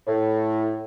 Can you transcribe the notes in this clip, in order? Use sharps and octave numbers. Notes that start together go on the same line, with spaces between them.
A2